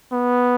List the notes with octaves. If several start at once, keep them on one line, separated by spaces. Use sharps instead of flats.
B3